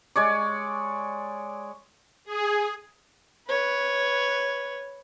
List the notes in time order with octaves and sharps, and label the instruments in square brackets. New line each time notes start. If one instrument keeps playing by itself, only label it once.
[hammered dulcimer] G#3 C#5 D5
[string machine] G#4
[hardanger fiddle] B4 C#5